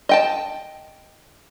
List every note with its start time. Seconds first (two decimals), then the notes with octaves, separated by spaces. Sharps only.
0.09 D#5 G5 A5